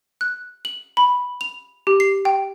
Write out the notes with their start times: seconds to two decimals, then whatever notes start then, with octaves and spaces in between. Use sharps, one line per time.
0.21 F#6
0.65 F#7
0.97 B5
1.41 F7
1.87 G4
2.00 C7
2.25 G5